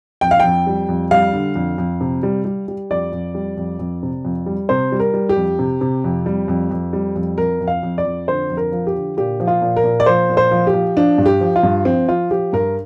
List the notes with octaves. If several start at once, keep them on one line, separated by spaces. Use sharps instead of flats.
F2 G5
F5
F2 G5
G3
F2
G3 F5
D3
F2
F2
C3
G3
G3
G3
F2 D5
F2
G3
F2
F2
C3
F2
G3
C3 C5
G3
A#4
G3
G4
F2
C3
C3
F2
G3
F2
F2
G3
F2
F2 A#4
F2
F5
F2
D5
F2
D3 C5
F2
A#4
F3
G4
D3
A#2 G4
F3
F4
A#2
A#4
A#2
D5
F3 C5
A#2
C5
F3
G4
F3
F3 D4
G2
G4
F3
F4
G2
F3 C4
F3 F4
F3 G4
G2 A#4